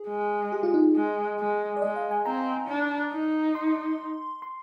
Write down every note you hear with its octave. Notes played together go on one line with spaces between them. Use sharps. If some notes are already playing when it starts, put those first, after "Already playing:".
Already playing: G#4
G#3
G4
F4
D#4
G#3
G#3
D5
G#3 D#5
F5
G#5
C4 A#5
D4
D#4
C6
C6